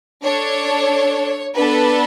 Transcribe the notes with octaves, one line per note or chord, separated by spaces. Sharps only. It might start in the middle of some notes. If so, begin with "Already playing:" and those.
D4 A4 C#5
B3 D4 A4 B4